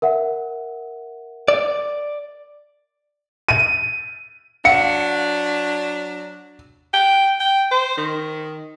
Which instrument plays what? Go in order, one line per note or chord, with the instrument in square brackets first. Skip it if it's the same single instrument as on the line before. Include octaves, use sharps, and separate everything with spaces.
[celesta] A#4 E5 F#5
[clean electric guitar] D5
[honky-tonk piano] D#7
[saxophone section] F#3 D4 [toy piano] F5 F#5 [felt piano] C#7
[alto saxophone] G5
G5
C5
D#3